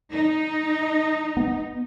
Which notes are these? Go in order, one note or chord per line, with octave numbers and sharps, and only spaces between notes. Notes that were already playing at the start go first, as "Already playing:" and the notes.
D#4
B3